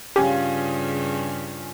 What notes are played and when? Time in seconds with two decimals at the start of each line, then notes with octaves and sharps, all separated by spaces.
0.16 G2 C#3 C#4 F4 G4 G#4